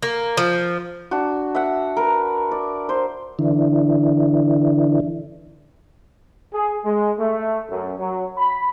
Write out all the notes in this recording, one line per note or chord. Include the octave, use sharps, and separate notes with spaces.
A#3
F3
D4 F#4
E5 F#5
A#4 B4
D5
C5
D3 E3
G#4
G#3
A3
F#2
F#3
B5